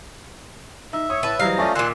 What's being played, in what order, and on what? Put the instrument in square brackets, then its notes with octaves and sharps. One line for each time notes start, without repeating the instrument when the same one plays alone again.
[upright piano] D#4 [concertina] E5
[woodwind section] C#5 [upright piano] D#6
[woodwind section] A2 A5 [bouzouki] B4 [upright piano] C#5
[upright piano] E3 F#3 G3 [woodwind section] C5 D#5 A#5 [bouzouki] F5
[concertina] A3 C#4 [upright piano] F4 D5 A#6
[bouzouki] A#2 D#3 [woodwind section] G#5 E6 [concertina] C6 F#6